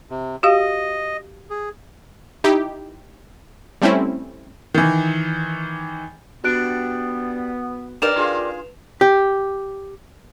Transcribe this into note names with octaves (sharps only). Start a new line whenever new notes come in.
C3
F#4 G4 D#5 F5
G#4
D#4 E4 G4
G3 A3 C4 C#4 E4
D#3 E3
G3 B3 D4 F#4 G4 F#6 D7
D4 G4 A#4 B4 D5 E7 F7
D4 F4 G#4
G4